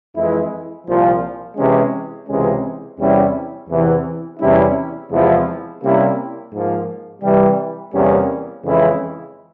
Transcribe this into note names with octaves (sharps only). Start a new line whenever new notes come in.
F2 E3 G#3 E4
C2 A#2 F3
C3 E3 G#3 C#4
C#2 C3 E3 G#3 C#4
E2 C3 G3 C#4 E4
E2 C3 E3
E2 C3 G3 C#4 E4
E2 C3 F3 G#3 E4
C3 G3 A#3 C#4 E4
G#2 F3 A#3
C3 E3 G3
E2 C3 G3 A#3 C#4
F2 C#3 E3 G#3 E4